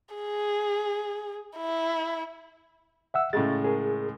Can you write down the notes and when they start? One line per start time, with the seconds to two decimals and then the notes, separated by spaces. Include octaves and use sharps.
0.15 G#4
1.58 E4
3.14 E5 F#5 E6
3.33 A2 C#3 G#3 A6
3.64 G#4 A#4